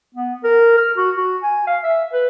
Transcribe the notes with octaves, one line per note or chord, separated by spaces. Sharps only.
B3
A#4
F6
F#4
F#4
G#5
F5
E5
B4